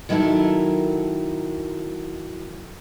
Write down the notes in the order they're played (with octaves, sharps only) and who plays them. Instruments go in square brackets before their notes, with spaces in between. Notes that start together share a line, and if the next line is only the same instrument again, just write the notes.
[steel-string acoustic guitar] D#3 F#3 E4 A4 A#4